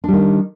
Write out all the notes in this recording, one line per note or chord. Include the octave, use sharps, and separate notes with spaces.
D#3 G3 D4